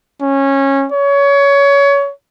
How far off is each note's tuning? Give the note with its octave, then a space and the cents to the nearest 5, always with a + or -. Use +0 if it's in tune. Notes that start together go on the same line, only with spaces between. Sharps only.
C#4 -15
C#5 +25